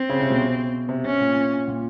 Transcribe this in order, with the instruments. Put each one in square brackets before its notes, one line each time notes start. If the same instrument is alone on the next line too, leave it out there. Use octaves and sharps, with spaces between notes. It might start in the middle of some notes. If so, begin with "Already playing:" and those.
Already playing: [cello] C4
[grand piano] C#3
C3
B2
C3
[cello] C#4
[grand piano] A#2
A#2